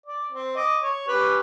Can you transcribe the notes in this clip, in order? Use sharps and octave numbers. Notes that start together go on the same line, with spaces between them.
D5
C4
D#5 D6
C#5
C#4 G4 B4